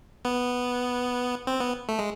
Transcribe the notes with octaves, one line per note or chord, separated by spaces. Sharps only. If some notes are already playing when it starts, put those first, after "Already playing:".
B3
C4
B3
A3
G#3